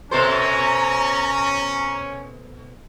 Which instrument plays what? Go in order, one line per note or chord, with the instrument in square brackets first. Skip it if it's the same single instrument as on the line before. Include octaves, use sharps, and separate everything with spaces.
[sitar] B2 A4 C5 [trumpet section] C#4 [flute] A#5